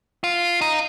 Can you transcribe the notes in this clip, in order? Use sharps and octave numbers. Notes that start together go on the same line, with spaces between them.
F4
D#4